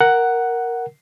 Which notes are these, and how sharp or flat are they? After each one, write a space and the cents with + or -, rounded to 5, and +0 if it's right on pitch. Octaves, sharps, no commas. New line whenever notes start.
A#4 +0 F#5 +5